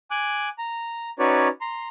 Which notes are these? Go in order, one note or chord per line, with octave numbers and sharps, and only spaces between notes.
G#5 D6 F#6
A#5
C#4 D#4 F#4 B4 C#5 D5
A#5 C6